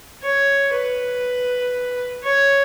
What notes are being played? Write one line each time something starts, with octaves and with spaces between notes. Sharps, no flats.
C#5
B4
C#5